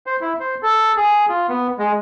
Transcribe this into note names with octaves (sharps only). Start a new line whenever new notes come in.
C5
E4
C5
A4
G#4
F4
B3
G#3